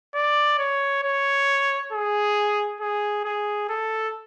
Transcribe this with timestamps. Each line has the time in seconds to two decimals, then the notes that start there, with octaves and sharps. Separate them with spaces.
0.15 D5
0.59 C#5
1.03 C#5
1.93 G#4
2.81 G#4
3.25 G#4
3.69 A4